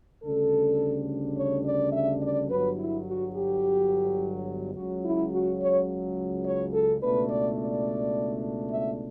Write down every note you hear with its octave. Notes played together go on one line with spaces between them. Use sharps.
D2 C#3 G3 D4 A4
C#5
D5
E5
D5
G1 G2 F#3 B4
E4
F#4
G4
C#2 C#3 F#3 F#4
E4
F#4
C#5
C#5
A4
C#2 B2 A3 D4 B4
D5
D5
E5